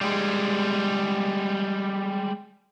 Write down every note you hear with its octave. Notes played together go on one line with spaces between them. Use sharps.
G3 G#3